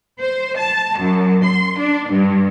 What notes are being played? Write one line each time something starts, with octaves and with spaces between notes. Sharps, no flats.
C5
A5
F#2
C6
D4
G2